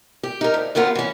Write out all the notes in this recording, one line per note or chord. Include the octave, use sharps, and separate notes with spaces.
G4
D#4 A#4
D2
F#2 C3 A#3 B3 F4
E3 C#4